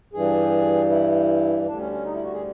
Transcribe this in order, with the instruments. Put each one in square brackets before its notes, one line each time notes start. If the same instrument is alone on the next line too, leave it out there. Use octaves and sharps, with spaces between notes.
[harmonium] G2 E3 G3 G#4
E4
D2 D3 G3 D4
C#4
C#4
D#4
E4
F#4
G#4